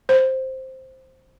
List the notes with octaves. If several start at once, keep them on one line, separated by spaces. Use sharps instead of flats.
C5